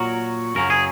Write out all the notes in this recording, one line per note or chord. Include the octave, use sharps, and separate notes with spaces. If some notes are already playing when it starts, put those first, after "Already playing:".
Already playing: A#2 F#3 F#4 A#4
F#2 C#3 F#3 A#4
G#4